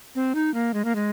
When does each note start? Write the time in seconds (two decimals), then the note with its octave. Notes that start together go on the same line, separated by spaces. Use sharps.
0.15 C4
0.35 D#4
0.54 A#3
0.74 G#3
0.85 A#3
0.95 G#3